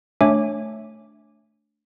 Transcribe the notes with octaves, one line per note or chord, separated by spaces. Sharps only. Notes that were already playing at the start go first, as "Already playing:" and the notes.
A3 D4 C#5 E5 G#5 D6